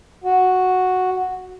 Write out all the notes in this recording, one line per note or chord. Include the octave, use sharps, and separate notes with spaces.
F#4